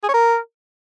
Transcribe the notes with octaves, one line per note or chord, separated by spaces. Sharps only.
G#4
C#5
A#4